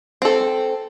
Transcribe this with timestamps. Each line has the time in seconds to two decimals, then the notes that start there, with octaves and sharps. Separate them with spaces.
0.22 C4 A4